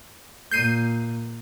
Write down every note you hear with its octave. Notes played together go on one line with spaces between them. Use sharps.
A#2 G6 C7 D#7